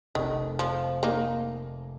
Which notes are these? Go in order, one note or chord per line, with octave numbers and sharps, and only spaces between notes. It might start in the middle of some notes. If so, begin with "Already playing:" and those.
F1 F2 C3 D#3
F3
A#3 D#4